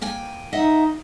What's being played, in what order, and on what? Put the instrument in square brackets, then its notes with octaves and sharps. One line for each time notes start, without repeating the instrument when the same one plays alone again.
[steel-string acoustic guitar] A#3 G5 G#5
[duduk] D#4 [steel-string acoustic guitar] D#5 E5 F#5